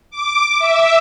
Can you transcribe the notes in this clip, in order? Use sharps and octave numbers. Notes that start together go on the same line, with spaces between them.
D6
E5